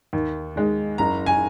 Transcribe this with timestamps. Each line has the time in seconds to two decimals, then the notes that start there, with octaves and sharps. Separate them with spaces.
0.13 D#2
0.56 D#3 G#3
0.98 F#1 A#5
1.26 G#5